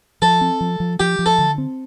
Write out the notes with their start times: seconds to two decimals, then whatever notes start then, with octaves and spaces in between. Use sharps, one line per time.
0.22 F3 A4
0.41 C4
0.61 F3
0.80 F3
1.00 F3 G4
1.19 F3
1.26 A4
1.38 D3
1.58 C4